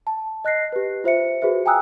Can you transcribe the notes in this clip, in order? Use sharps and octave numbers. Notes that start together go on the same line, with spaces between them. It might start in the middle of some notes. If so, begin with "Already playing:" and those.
A5
D#5 F#6 A#6 C7
G4 B4
F4 C5 E5 C#7
F#4 G#4 B4 C5 E5
G5 G#5 A#5 D#6 E6 F#6